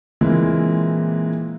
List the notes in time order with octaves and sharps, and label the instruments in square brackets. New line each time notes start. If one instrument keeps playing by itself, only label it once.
[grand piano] A#2 E3 G#3 A#3 C4 E4